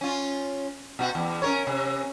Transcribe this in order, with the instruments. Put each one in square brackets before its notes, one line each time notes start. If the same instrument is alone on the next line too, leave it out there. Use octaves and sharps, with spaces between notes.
[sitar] C#4 F4
B2 F#4
E2
C#4 A#4 C#5
C3